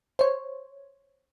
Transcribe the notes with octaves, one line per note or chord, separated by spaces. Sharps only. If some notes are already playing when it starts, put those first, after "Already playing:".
C5 C#5